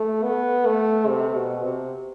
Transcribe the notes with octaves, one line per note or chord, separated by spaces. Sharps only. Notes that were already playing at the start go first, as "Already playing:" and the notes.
Already playing: A3
B3
A3
C3
B2
C3